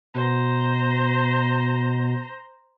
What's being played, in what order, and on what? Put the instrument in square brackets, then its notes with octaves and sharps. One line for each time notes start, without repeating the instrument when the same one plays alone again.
[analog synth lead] B2 [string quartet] C5 A#5